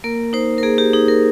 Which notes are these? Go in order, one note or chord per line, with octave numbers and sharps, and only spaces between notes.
A#3 A#4
D#4 C5
A#4
A#3 G#4
G4
D#4 G#4
A#4